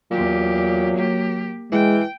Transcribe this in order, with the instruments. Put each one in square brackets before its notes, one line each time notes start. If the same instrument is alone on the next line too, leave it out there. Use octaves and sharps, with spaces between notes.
[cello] E2 G4 [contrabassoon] A#2 [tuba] F#3
[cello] A#3 G4
[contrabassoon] E3 [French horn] G#3 [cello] G5